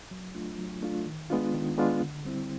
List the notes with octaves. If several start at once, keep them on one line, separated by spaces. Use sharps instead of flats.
F#3
A3 D4 F4
F#3
A3 D4 F4
D#3
G#3 B3 D4 F4
D#3
G#3 B3 D4 F4
D3
G3 C4 E4